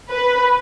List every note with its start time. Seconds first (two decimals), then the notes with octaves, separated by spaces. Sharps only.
0.10 B4